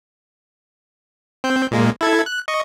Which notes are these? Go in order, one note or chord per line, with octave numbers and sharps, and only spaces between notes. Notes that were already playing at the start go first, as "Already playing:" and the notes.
C4 G6
A#2 G#3 A#3
E4 A4 G#6
F#6
D#5 C#6